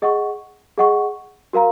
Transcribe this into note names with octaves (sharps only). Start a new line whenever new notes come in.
G#4 D#5 F#5 C#6
G#4 D#5 F#5 C#6
F#4 A#4 F5 A#5